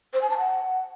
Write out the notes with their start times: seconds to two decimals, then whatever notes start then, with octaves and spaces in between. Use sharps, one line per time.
0.13 C5
0.21 G#5
0.30 A5
0.38 F#5